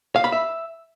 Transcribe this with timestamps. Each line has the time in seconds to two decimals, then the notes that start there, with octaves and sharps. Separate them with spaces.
0.16 F5
0.24 B5
0.32 E5